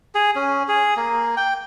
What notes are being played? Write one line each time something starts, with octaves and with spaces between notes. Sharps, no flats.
G#4
C#4
G#4
A#3
G5